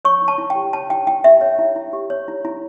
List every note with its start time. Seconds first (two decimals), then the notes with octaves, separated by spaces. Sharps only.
0.05 C#5 C#6
0.22 E4
0.28 A5
0.38 E4
0.50 G5
0.55 G4
0.73 C#5 A5
0.90 E4 G5
1.07 E4 G5
1.24 G4 E5
1.41 C#5
1.59 E4
1.76 E4
1.93 G4
2.10 C#5
2.28 E4
2.45 E4